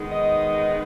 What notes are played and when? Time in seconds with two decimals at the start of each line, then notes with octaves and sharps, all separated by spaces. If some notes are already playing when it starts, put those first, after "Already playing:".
Already playing: D#3 G#3 B3 D#4
0.10 D#5